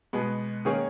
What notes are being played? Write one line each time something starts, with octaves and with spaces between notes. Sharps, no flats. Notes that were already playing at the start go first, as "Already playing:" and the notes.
B2 G#3 B3
D#3 A#3 C#4 G#4 C#5